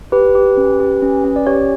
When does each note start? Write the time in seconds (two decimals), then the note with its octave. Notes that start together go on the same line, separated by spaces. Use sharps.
0.12 G4 B4
0.35 G4
0.57 C#4
0.80 G4
1.02 C#4
1.24 C#4
1.36 D5
1.47 G4 C#5